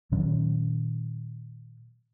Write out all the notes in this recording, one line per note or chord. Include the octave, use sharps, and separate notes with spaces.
A#2 D#3 F#3 C#4